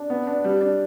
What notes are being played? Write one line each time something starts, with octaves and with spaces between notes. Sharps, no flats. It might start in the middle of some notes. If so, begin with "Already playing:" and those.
Already playing: D4
B3
D4
G3
D4